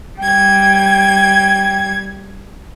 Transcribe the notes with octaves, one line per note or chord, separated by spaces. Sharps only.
G3 G5 G#6